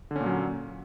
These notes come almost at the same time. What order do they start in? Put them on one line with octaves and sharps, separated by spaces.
D3 C#4 A#2 F#3